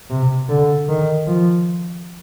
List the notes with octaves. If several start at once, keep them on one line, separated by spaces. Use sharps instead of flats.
C3
D3
D#3
F3